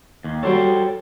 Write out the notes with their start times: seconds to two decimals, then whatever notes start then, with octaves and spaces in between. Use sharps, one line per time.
0.24 D#2
0.43 G3 F#4 A4 C5 C#5 G5